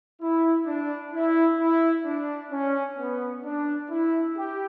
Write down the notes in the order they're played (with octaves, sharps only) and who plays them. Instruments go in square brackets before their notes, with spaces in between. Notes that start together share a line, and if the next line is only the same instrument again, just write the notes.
[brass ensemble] E4
D4
E4
E4
D4
C#4
B3
D4
E4
G4